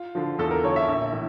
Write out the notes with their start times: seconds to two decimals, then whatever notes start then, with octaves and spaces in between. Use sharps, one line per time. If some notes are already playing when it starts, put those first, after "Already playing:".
Already playing: F4
0.15 D3 F3
0.38 E2 A4
0.51 A#4
0.64 D3 F3 C#5
0.76 E5
0.88 A#1
1.13 A2 E3